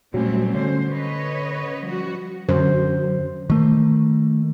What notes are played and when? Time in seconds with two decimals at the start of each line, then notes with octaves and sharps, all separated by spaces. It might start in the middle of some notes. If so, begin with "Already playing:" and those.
0.14 A#2 F#3 G3 A3 C4 C#4
0.55 D3 C#4 C5
0.89 B4 C#5 D#5
1.83 F3 G3 F#4
2.49 F#2 D3 C5
3.50 D#3 A3 A#3